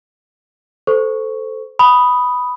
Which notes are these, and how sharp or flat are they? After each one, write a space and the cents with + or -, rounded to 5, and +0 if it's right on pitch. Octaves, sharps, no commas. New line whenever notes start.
A4 +0 C5 -15 C#6 +0
B5 +0 D#6 +0